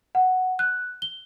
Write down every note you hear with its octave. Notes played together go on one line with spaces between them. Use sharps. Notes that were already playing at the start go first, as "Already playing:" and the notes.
F#5
F#6
G7